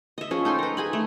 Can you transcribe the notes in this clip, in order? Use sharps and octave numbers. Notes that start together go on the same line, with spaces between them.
D#5 E5
F3 C#4 G#4
D#4 A4 G5 C6
B4 A#5
G#4 G#5 B5
A3